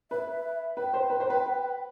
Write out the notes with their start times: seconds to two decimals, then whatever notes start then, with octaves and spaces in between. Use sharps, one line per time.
0.11 B4 E5
0.77 B4 G5
0.94 C5
1.10 B4
1.20 C5
1.30 B4